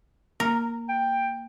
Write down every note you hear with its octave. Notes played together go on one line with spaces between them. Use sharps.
A#3 A#4
G5